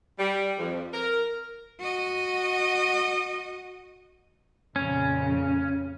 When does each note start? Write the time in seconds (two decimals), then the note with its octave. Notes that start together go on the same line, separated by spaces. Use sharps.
0.19 G3
0.59 F2
0.93 A#4
1.79 F#4 D#5
4.76 F2 A#2 C#3 C#4